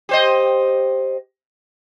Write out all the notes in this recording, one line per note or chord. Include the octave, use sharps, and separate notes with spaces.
G4 C5 D#5